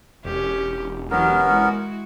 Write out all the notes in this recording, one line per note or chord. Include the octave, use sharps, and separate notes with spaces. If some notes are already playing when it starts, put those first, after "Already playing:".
E1 C#4 G4
E2 F#3 B3 C#4 G4 A#4
G#3 E4 F#4